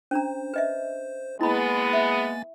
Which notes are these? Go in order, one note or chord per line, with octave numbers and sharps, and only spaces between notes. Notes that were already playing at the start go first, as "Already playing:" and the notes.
C#4 D4 C5 A#5
B4 D#5 E5
G#3 A#3 B3 E4 G#5 B5 A6
E5